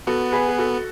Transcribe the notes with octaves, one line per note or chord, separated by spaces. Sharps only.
B3 F#4 A4
G#4 B4
G#4
F#4 A4